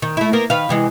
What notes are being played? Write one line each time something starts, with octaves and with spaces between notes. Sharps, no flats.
D#3
A3 E4
A#3 B3 A#4
D#3 B4 F5
C3 E3 G#3